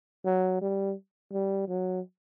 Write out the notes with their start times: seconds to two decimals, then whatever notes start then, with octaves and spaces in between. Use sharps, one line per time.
0.25 F#3
0.61 G3
1.33 G3
1.68 F#3